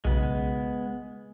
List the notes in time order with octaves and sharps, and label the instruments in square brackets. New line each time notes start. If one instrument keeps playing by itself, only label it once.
[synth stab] B1 C#3 [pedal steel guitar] G#3 B3